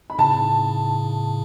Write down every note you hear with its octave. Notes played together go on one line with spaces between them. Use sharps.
B5
A2 C#3 A5